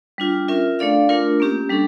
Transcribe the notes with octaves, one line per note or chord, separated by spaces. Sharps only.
G3 D4 F4
C#4 F4 A#4 E5
A3 D4 A4 D5 F5
A3 D4 F4 A#4
A#3 C#4 G4
G3 D4 A4